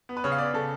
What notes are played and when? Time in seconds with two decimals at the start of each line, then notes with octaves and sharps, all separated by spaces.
0.09 B3
0.17 B4
0.24 C#3 C#5
0.32 F5
0.38 B3 D5
0.54 C#3 A4